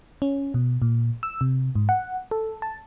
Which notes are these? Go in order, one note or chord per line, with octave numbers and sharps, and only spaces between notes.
C#4
B2
A#2
E6
C3
G#2
F#5
A4
A5